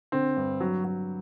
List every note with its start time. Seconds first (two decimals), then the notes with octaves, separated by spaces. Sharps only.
0.12 D3 C4
0.37 G2
0.61 F#3
0.84 F#3